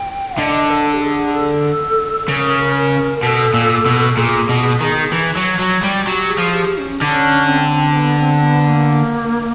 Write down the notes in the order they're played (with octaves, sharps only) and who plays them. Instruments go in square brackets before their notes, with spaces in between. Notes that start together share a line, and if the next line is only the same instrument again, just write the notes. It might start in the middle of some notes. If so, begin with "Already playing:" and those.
Already playing: [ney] G5
[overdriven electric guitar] D3 [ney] D#5
[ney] A4
G4
A4
G#4
A4
[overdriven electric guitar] C#3 [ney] A#4
[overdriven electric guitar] B2 [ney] A#4
[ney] A4
[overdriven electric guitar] A#2
B2
[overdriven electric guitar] A#2 [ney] G#4
[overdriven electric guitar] B2
D#3
E3
F#3
F#3
G3
[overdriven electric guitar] F#3 [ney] G4
[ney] G#4
[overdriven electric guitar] F3
[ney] G4
C#4
[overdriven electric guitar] D3 [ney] C#4 D#4
[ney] C4
B3
C4
B3
A#3